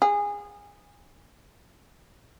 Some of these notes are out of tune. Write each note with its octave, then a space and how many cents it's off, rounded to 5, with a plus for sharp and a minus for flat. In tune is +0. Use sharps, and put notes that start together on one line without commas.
G#4 -20